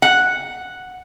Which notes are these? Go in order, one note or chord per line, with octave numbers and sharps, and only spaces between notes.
F#5